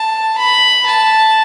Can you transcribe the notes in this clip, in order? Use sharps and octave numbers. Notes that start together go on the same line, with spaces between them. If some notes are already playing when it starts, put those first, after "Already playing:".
Already playing: A5
B5
A5